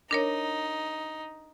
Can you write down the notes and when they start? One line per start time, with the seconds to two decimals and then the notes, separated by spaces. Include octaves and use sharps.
0.11 D4 D#4 A#4 C#5